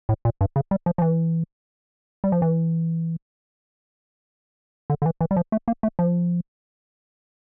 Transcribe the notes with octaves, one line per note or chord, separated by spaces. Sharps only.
A2
A#2
G2
C#3
G3
F3
F3
E3
G3
F3
E3
D3
D3
E3
E3
G3
F3
A3
A#3
A3
F3